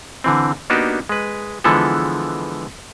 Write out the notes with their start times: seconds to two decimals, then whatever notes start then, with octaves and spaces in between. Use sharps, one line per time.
0.24 D3 E3 C4
0.70 A#3 B3 D4 D#4 F#4 G4
1.09 G#3 B4
1.64 D3 E3 F3 G#3 B3 A4